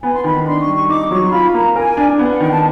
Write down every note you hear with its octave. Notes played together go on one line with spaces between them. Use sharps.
B3 G#5
C6
D#3 B5
D4 C6
C#6
G3
C#6
D#4 D6
F#3 C#6
C6
F4 B5
A#3 A#5
A#4 G#5
D4
B3 G5
F#5
D#3 G5
A5